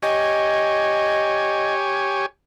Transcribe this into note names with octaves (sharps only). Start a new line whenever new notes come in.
G4 C#5 D#5 G#5